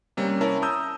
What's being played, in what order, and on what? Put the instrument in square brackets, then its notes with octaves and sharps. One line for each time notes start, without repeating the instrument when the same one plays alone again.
[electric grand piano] C3 G3 A#3 C#4
C#4 E4 A#4 A5
A5 A#5 D#6 E6 G6